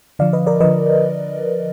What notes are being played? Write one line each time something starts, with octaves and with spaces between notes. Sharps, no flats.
D3 F3 D5 F5
B4 D#5
A#4 D5
D3 F3 B4 D#5